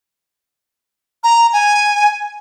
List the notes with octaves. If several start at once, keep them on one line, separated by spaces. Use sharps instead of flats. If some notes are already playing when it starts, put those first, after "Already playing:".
A#5
G#5